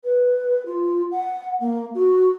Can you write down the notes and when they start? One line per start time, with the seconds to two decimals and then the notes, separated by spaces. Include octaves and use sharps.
0.04 B4
0.66 F4
1.11 F#5
1.60 A#3
1.94 F#4